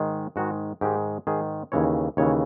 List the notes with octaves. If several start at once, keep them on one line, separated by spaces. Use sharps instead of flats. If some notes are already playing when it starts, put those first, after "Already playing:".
Already playing: G#2 D#3 G#3
G#2 D#3 G#3 F#4
G#2 D#3 G#3 G4
G#2 D#3 G#3 G#4
D#2 C#3 E3 C#5
D#2 C#3 E3 C#5